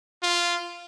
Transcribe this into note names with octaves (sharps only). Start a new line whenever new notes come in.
F4